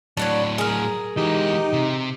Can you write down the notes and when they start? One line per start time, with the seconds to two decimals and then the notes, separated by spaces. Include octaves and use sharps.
0.17 A2 F#3 D4 B4 C#5
0.58 G#4 A#4
1.17 E3 G#3 D#4 G4
1.74 C3